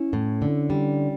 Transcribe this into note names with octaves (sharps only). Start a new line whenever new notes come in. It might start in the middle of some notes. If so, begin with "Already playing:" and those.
Already playing: C#4 E4
A2
D3
G3